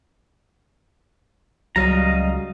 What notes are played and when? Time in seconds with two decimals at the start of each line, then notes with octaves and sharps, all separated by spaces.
1.76 C#2 F#3 G3 D#5 F5 A#5